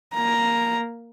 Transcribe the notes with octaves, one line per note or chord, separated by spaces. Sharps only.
A#3 A#5